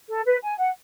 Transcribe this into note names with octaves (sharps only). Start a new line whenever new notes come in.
A4
B4
G#5
F#5